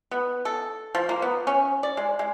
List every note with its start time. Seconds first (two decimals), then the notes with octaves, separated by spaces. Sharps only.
0.11 B3
0.45 A4
0.95 F3
1.09 A#3
1.22 B3
1.47 C#4
1.83 D5
1.97 G#3
2.19 G#3